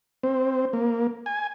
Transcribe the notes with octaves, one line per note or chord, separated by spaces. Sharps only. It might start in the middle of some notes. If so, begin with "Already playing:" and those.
C4
A#3
G#5